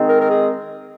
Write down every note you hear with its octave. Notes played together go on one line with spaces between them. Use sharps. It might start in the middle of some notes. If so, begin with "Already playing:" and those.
Already playing: D#3 G#3 C4 D#4
A#4
A#4
G#4